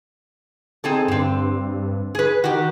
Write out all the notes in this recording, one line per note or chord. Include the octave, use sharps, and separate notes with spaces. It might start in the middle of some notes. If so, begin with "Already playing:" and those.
C4 D#4 G#4 A4
G2 D3 C4
G#4 B4
D#3 F#4 G4